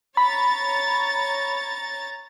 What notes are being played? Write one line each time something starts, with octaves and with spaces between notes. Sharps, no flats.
C#5 A#5 B5 A6